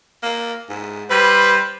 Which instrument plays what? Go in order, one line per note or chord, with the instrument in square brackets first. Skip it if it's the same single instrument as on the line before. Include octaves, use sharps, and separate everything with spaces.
[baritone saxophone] A#3
G#2
[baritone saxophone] G3 [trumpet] B4 [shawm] C5